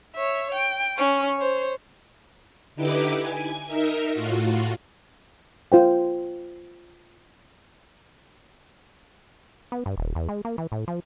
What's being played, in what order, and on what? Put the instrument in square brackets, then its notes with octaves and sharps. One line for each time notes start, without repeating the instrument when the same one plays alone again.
[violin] C#5 E5
G5
C#4 C#6
C5 C#5
[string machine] D3 D#4 E4 G4 B4 D6
G#5 G#6
D#4 A#4 E5
A2 F4 F#4
[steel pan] F4 C5 G5
[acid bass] B3
G2
D#1
E2
G#3
A#3
E3
A2
F3